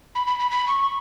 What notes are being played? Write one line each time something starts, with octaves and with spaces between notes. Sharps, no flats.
B5
B5
B5
B5
C#6